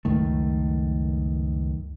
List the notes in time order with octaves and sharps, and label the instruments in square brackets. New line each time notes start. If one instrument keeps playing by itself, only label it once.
[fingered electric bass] C#2 F#2 D#3 A3